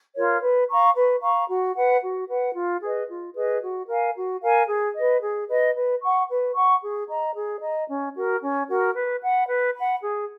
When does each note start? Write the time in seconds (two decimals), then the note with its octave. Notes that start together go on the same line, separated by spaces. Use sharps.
0.16 F4 A#4 C#5
0.42 B4
0.69 F5 A#5 C#6
0.95 B4
1.22 F5 A#5 C#6
1.49 F#4
1.76 B4 F#5
2.02 F#4
2.29 B4 F#5
2.55 F4
2.83 G#4 B4 D#5
3.09 F4
3.36 G#4 B4 D#5
3.62 F#4
3.89 A#4 F5 G#5
4.16 F#4
4.42 A#4 F5 G#5
4.68 G#4
4.96 B4 D#5
5.22 G#4
5.49 B4 D#5
5.75 B4
6.02 F#5 C#6
6.29 B4
6.55 F#5 C#6
6.82 G#4
7.09 D#5 A#5
7.35 G#4
7.62 D#5 A#5
7.89 C#4
8.15 F#4 A#4
8.42 C#4
8.69 F#4 A#4
8.95 B4
9.22 F#5 B5
9.49 B4
9.75 F#5 B5
10.03 G#4